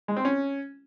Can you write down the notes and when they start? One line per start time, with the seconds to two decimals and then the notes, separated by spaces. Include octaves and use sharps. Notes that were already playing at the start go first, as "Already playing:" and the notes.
0.08 G#3
0.17 C4
0.25 C#4